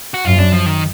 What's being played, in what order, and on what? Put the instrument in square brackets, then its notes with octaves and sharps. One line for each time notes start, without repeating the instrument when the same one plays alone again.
[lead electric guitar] F#4
[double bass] F#2 [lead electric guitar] F4
[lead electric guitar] D4
F3
D#3